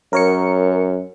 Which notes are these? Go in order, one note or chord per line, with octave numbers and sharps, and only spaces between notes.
F#2 A#4 C#5 C#7